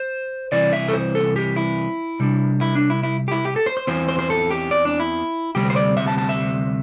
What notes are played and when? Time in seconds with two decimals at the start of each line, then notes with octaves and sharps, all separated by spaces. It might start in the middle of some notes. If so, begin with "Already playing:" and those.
Already playing: C5
0.52 C2 C3 E3 D5
0.73 E5
0.89 A4
0.93 C5
1.15 A4
1.36 G4
1.56 E4
2.20 C3 G3 D4
2.61 E4
2.75 D4
2.90 E4
3.03 E4
3.28 G4
3.31 E4
3.45 G4
3.56 A4
3.66 C5
3.77 C5
3.87 E2 E3 C4 C5
4.08 C5
4.19 C5
4.30 A4
4.50 G4
4.71 D5
4.85 D4
5.00 E4
5.55 D2 C3 G3 C4 G4
5.70 C5
5.76 D5
5.97 E5
6.08 A5
6.18 A5
6.29 E5